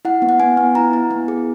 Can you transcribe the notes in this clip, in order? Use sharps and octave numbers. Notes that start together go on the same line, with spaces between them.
E4 F#5
B3
F#5
B3 G#5
B3
E4 A#5
E4
B3
G#4